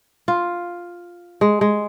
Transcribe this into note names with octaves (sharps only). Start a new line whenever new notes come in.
F4
G#3
G#3